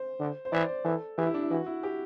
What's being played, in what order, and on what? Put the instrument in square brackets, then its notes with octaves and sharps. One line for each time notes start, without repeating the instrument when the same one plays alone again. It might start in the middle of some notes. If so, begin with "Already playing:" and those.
Already playing: [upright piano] C5
[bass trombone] D3
[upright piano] C5
[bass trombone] E3 [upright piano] D5
[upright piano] C5
[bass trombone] E3 [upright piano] A4
[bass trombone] E3 [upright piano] G4
[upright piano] E4
D4
E4
[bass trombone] E3 [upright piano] F#4
[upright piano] E4
G4